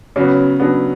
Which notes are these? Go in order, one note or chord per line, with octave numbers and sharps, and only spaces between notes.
C#3 F#3 B3 C#4
C#3 F#3 B3 D4